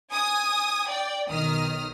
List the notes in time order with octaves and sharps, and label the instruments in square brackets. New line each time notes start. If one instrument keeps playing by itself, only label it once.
[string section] G#5 D#6
D5 G5
B1 D#3 D#6 F6